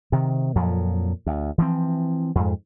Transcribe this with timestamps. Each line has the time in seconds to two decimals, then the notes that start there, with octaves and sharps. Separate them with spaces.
0.12 C3 D#3
0.56 F2 A#2 F3 F#3
1.26 D2
1.58 E3 F3 C4
2.35 F2 G#2